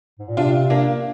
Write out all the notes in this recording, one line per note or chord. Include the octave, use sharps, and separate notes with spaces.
G#2
A#2
C3 D4 F4
A#3 D4